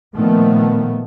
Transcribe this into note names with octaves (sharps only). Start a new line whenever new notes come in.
A#2 D#3 F3 A3 B3